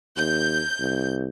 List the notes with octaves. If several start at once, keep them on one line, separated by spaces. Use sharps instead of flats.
D#2 G6
C2